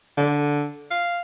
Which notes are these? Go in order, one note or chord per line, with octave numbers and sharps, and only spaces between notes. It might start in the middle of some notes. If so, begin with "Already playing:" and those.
D3
F5